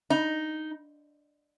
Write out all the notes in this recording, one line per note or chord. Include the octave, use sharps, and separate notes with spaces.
D#4